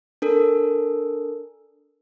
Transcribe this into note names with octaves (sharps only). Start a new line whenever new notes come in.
D4 A4 A#4